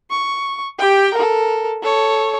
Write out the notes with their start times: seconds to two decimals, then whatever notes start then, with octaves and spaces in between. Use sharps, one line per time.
0.11 C#6
0.79 G4 G5
1.14 A4 A#4
1.82 A4 C#5